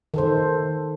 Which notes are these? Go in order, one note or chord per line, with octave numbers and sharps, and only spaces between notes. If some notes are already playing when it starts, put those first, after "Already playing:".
D#3 A4 C5